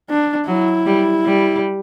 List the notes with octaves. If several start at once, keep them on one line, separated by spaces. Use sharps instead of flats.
D4
F#3 E4
G3
G3